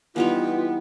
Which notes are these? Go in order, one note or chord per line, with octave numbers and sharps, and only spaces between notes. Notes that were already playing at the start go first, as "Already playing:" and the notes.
E3 G3 B3 D#4 F4